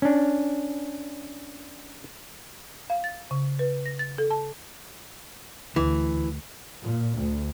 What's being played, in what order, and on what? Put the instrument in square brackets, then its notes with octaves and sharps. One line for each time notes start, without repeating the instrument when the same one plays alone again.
[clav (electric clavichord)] C#4 D4
[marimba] F5
A6
C#3
B4
A#6
A6
A4
A5
[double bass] D2 [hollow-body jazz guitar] E3
[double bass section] A#2
D2